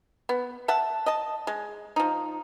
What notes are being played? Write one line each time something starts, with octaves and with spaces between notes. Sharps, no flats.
B3
E5 F#5 A5
D#5 A5
G#3
F3 D#4